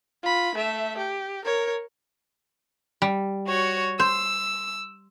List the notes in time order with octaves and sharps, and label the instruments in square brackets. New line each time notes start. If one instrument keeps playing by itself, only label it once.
[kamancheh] F4 B5
A3 E5
G4
A#4 C#5
[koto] G3
[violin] F#4 C#5
[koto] C5 [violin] E6